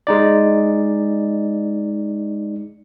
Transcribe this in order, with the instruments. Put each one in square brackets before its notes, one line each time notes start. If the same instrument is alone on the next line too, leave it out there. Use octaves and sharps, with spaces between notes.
[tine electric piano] G#3 D#4 D5